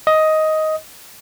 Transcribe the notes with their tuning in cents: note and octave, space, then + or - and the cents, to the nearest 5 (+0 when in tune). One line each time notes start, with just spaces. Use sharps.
D#5 +10